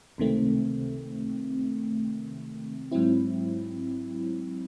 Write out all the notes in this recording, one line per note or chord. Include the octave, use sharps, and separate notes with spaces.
C#2 C3 D#3 A3 C4
G#2 F#3 C4 E4